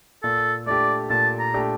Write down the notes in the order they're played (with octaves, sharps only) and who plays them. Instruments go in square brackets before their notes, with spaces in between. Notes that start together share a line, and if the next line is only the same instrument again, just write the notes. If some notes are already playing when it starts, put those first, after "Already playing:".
[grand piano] A#2 [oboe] A4
[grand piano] A3 D4 G4 [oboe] D5
[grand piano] A#2 [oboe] A5
[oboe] A#5
[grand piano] A3 D4 G4